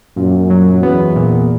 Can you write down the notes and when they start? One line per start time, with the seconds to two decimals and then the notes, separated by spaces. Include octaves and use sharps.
0.17 F#2 A#2
0.50 F#3
0.83 E2 B3
1.16 A#2